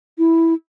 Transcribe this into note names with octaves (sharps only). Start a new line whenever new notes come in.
E4